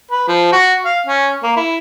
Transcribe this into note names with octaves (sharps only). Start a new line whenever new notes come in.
B4
F3
F#4
F5
C#4
A#3
E4